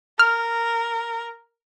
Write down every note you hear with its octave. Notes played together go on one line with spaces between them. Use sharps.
A#4 F6